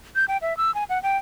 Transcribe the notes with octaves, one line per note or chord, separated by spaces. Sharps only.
G6
G5
E5
E6
G#5
F#5
G5